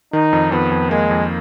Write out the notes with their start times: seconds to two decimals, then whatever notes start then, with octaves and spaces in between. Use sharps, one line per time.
0.13 D#3 D#4
0.33 F2
0.52 F2 B3
0.72 F2
0.91 G#3 A#3
1.11 F2